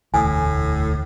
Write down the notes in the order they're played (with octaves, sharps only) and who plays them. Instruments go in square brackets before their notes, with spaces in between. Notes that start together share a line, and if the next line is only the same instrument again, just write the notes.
[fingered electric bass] E1 D2 E3 [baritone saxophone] A2 [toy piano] G#5 D#6